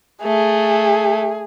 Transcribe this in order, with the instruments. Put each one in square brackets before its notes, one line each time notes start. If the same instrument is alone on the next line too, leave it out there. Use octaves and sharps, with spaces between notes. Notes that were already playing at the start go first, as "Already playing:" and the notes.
[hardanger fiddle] A3 [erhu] G#4